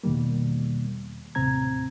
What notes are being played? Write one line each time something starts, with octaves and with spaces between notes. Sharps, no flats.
E2 B2 D#3 G3 A#3
D#2 A2 C3 C4 A#5 G#6